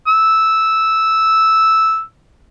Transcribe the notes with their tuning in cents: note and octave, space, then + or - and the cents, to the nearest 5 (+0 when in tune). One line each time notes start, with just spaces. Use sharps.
E6 -5